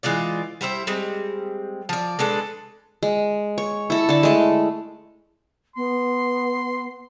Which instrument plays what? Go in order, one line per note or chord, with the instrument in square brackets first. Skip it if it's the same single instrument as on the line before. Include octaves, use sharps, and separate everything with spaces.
[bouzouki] E3 G#3 F4 D5
G3 E4 C5 E5
G3 G#3 C4
F3 D5
G#3 D4 A4 B4
[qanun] G#3
C#5
E4 A4
D3 A5
G#3 A3
[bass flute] B3 [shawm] C6